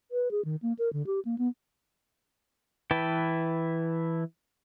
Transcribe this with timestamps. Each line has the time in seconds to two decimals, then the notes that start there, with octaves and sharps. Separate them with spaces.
0.11 B4
0.31 G#4
0.45 D#3
0.62 A#3
0.79 A#4
0.93 D3
1.07 G4
1.25 A#3
1.38 B3
2.91 E3 E4 B4 G5 A5